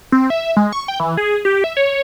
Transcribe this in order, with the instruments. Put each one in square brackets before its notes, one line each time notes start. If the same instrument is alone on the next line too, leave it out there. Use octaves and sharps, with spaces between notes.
[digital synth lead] C4
E5
G#3
C#6
G5
E3
G#4
G4
E5
C#5